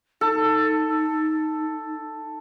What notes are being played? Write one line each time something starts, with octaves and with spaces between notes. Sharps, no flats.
D#4 A4